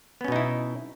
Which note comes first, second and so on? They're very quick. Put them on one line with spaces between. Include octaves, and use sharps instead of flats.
B3 C#4 B2 D#4 E4